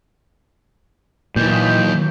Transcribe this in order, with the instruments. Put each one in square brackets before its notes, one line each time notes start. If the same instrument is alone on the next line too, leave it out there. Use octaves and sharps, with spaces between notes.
[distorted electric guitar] D#2 [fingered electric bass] A#2 [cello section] E3 F#3 [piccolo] G6